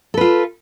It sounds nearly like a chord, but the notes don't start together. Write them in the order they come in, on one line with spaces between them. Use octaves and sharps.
A4 B4 F4